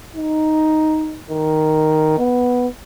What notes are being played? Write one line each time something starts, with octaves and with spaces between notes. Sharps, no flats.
D#4
D#3
B3